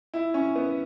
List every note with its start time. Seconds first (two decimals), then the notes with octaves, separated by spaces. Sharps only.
0.14 E4
0.34 C#4
0.56 B3